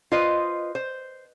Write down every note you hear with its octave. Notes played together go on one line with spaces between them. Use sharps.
F4 B4 C5 D#5
C5